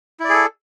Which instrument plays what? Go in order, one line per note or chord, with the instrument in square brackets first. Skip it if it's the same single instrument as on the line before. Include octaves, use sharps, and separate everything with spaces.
[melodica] E4
D5
G#4
A4